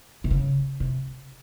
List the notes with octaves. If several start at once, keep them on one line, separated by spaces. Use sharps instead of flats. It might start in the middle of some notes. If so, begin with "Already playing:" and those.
C3
C#3
C3